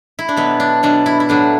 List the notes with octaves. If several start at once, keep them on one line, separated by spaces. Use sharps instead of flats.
E4
D4
B2 F#3 B3
D4
B2 F#3 D4
E4
E4
A2 F#3 D4